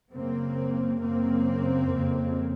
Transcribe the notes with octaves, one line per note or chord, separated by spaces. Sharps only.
F#2 C#3 A#3 C4
F#2 C#3 A#3 C4
F2 C#3